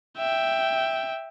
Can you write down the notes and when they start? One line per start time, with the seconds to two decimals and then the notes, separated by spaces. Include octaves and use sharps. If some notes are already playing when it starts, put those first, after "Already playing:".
0.18 E5 G5